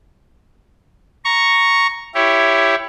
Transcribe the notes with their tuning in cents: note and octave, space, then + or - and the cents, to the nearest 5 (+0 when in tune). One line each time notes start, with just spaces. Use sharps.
A#5 +0 C#6 +0
E4 +10 G4 +0 C#5 +0